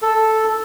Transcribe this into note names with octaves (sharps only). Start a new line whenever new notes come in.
A4